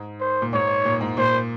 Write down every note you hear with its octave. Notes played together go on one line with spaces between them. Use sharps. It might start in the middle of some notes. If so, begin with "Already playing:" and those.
Already playing: G#2
C5
A#2
G#2 C#5
A#2
G#2
A#2 C5